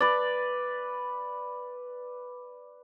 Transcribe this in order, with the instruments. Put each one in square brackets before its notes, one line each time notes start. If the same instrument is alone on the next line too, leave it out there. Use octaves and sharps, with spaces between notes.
[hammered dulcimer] B4 D5